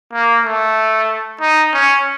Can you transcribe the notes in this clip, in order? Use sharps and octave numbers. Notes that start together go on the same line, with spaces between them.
A#3
A3
D#4
C#4